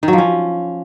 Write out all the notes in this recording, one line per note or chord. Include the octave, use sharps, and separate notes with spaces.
D#3
F#3
F3
C#4